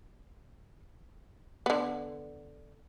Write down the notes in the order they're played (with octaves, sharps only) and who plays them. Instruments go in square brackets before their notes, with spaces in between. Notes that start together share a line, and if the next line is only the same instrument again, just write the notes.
[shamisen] D3 B3